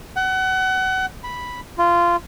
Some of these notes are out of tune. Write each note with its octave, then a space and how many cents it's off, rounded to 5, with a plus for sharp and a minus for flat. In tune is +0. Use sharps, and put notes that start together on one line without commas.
F#5 +30
B5 -5
F4 -15